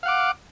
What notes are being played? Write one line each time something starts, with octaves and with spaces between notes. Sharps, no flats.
F5 F#5 D6